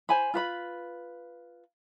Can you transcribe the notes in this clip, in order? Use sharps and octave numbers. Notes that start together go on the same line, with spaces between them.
C5 G#5 B5
F4 B4 B5